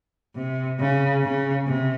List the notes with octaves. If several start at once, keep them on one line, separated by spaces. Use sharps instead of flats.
C3
C#3
C#3
C3